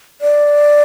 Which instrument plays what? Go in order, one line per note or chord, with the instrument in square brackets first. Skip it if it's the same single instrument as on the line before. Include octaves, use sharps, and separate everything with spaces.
[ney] D5